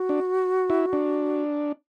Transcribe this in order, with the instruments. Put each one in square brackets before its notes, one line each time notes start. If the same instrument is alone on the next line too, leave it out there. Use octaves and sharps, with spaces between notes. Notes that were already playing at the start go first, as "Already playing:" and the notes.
Already playing: [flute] F#4
[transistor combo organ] D4
E4
D4